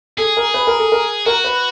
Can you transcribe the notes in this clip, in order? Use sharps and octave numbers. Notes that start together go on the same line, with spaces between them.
G#4 A4
A#4
B4
A#4
A4
A#4
F#4 A#4
B4